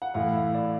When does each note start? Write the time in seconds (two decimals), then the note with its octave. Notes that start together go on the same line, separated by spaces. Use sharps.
0.02 F#5
0.14 A2 E3 F5
0.33 E5
0.54 D5